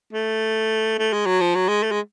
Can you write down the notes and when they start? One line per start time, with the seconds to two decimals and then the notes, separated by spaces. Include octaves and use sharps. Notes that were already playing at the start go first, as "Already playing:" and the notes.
0.13 A3
0.98 A3
1.13 G#3
1.26 F#3
1.41 F3
1.55 F#3
1.68 G#3
1.83 A3
1.92 G#3